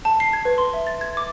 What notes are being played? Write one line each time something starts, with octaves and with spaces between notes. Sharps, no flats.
A5
C7
G#6
B4
C6
E5
A6
G#6
D6